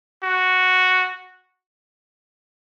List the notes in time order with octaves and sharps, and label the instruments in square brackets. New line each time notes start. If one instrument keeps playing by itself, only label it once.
[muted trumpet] F#4